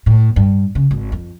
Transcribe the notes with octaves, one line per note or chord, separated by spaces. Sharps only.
A2
G2
C#3
G#1
F2